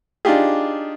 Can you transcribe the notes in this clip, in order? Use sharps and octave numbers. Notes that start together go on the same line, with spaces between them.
D4 D#4 F4 G4 G#4